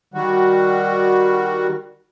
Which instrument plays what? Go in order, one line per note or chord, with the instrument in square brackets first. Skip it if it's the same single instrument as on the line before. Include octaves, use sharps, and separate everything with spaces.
[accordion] D#3 G3 F#4